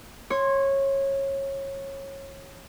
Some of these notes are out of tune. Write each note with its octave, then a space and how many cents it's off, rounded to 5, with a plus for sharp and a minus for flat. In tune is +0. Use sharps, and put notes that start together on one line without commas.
C#5 -20 C6 +10